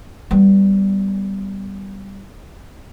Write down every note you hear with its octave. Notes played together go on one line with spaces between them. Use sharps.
G3 B3